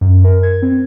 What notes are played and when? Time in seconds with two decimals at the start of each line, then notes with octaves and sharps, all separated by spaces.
0.01 F#2
0.24 A#4
0.43 G#6
0.62 C4